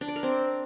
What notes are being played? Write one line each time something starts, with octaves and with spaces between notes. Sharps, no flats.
D4
D5
A#4
C4